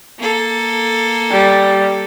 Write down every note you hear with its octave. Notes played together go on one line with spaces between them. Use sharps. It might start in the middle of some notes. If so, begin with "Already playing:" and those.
A#3 A4
G3